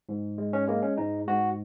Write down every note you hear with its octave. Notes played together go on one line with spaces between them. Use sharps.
G#2
G#3
C#4
G#3 A#3
C#4
G#2 D#4
G#2 F#4